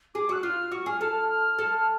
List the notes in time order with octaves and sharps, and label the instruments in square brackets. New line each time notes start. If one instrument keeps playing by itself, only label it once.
[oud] G#4 [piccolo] D6
[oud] F#4 [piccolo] F#6
[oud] F4 [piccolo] F6
[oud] F#4 [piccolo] C#6
[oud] G#4 [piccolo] F6
[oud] A4 [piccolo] F6
[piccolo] F6
[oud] A4
[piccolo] F6